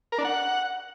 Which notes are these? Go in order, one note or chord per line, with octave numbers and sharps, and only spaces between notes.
A#4
D4
F#5